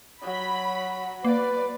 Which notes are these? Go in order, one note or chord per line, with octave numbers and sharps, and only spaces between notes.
F#3 B5
A#3 B4 D5